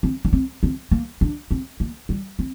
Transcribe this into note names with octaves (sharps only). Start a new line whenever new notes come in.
C4
D4
C4
C4
A#3
D4
C4
A#3
G3
C4